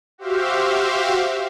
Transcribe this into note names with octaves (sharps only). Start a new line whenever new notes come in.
F#4 G4 C5 E5 F5